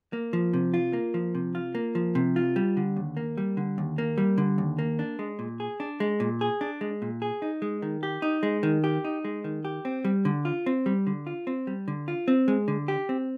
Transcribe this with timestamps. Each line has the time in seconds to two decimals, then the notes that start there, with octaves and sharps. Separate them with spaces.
0.13 A#3
0.33 F3
0.53 C3
0.74 F4
0.93 A#3
1.14 F3
1.35 C3
1.55 F4
1.75 A#3
1.95 F3
2.15 C3
2.36 F4
2.56 G3
2.77 D3
2.96 D#2
3.17 A#3
3.38 G3
3.57 D3
3.78 D#2
3.98 A#3
4.18 G3
4.38 D3
4.58 D#2
4.79 A#3
4.99 D4
5.19 G#3
5.39 A#2
5.60 G#4
5.80 D4
6.00 G#3
6.20 A#2
6.41 G#4
6.61 D4
6.81 G#3
7.02 A#2
7.22 G#4
7.42 D#4
7.62 G#3
7.82 D#3
8.03 G4
8.22 D#4
8.43 G#3
8.63 D#3
8.84 G4
9.04 D#4
9.25 G#3
9.44 D#3
9.65 G4
9.85 C4
10.05 G3
10.25 D3
10.45 F4
10.66 C4
10.86 G3
11.07 D3
11.27 F4
11.47 C4
11.67 G3
11.88 D3
12.08 F4
12.28 C4
12.48 G#3
12.68 D3
12.88 G4
13.09 C4